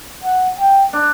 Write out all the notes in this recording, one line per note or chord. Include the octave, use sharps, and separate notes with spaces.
F#5
G5
D4